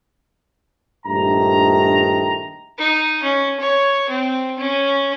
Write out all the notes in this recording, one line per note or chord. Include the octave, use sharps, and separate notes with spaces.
A#1 G2 D#3 A3 A#5
D#4
C#4
C#5
C4
C#4